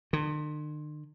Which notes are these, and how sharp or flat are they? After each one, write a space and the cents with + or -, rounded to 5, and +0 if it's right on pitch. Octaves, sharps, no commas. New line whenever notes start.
D3 +45